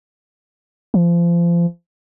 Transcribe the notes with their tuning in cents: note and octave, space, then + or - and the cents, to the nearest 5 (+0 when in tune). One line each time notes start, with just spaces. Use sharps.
F3 -30